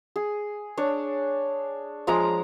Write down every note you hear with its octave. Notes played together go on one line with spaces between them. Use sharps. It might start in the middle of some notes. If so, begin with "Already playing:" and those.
G#4
D4 C#5
F3 G#3 A#5 D6